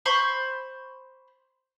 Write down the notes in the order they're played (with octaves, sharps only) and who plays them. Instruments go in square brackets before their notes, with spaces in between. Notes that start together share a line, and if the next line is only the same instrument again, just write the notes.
[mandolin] C5 B5 C#6